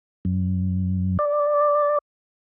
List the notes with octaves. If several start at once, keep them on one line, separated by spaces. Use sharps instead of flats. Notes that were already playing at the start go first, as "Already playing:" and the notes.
F#2
D5